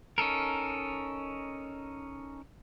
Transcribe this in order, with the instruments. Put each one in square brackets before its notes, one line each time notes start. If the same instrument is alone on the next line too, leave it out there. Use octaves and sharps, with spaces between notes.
[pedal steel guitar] C#4 D#4 A4 A#4